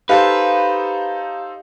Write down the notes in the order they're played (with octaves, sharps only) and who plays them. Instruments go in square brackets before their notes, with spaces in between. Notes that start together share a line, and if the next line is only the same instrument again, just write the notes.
[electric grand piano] D#4 A4 C5 [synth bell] G4 F5 [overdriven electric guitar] B4